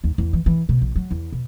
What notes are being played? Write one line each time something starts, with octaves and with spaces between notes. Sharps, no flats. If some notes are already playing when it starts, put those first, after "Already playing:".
D#2
E2
E3
E3
B2
A#1
F#3
E2
B2